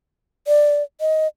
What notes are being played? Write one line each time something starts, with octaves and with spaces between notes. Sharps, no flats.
D5
D#5